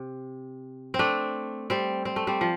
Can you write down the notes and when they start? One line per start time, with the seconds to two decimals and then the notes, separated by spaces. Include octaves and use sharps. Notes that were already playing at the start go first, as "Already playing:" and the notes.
Already playing: C3
0.94 C4
0.99 A3 D4
1.70 G3 C4
2.05 C4
2.16 A3
2.27 G3 C4
2.41 F3